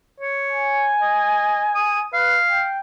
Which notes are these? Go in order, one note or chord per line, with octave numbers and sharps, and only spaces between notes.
C#5
G#5
D#5
D#6
B4 F5
G5